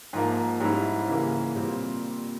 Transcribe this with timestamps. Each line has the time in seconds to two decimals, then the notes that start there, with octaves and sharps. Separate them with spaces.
0.13 G#2 F3 A#3
0.60 G#2 G3 C#4 E4
1.08 C#3 E3 A#3
1.56 A#2 G3 C4